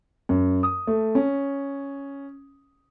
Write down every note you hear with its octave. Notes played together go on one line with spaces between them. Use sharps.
F#2
D#6
A3
C#4